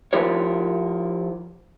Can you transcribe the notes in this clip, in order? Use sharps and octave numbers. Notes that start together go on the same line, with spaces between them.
F3 E4 G4 A#4 C#5